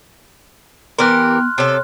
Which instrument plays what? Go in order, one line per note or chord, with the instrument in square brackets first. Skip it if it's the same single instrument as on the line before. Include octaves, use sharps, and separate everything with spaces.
[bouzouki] E3 G4 A#4 [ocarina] B3 [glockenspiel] C6 F6 F#6
[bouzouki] C3 A4 [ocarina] C#5